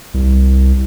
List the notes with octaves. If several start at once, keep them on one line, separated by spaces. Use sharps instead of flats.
C2